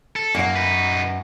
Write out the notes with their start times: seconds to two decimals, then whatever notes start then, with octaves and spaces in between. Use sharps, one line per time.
0.16 A4
0.35 F#2 F#3 A#3
0.56 D#4 B4